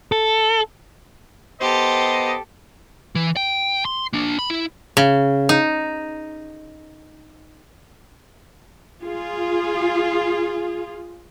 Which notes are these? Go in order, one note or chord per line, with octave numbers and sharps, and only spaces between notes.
A4
B3 G4 A4 C5 D#5
E3
G5
C6
A#3 D4
B5
E4
C#3
D#4
F4 G#4